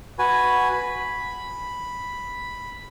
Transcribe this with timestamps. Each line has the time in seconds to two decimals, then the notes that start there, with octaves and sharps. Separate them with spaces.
0.19 F#4 B4 G#5
0.73 B5